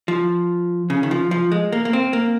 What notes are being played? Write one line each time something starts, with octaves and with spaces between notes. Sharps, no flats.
F3
C#3
D#3
F3
F3
G#3
A#3
A#3
C4
A#3